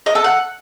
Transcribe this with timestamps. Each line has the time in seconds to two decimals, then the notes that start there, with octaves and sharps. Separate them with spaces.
0.06 D#5
0.15 A4
0.24 F#5